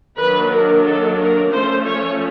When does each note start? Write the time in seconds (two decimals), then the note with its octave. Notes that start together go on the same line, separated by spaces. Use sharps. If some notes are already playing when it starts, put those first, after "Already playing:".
0.18 D#3 F#3 A#3 D4 B4
0.52 A#4
0.85 A4
1.19 A#4
1.51 F3 A3 C#4 C5
1.86 C#5